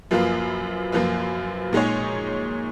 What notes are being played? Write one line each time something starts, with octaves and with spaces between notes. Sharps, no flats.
F#2 F3 A#3 F4 B4
F#2 F3 A#3 F4 B4
A#2 G#3 D#4 G#4 C#5